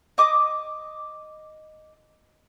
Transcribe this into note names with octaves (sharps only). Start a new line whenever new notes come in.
D#5 D6 D#6